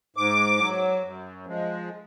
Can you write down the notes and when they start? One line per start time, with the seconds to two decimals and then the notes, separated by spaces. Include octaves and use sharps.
0.16 G#2 D6
0.59 F#3
1.03 F#2
1.46 F3 G#3